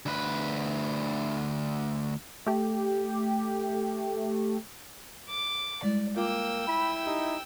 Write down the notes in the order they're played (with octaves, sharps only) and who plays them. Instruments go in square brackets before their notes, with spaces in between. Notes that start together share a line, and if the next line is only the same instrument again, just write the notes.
[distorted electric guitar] D2 B4
[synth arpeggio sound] A3 G4
[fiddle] D6
[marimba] G3 G#3 E4 [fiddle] D5
[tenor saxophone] A#3 [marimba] F4 D6 [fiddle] G5 E6
[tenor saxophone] E4 [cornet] B5
[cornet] D#4 [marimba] G4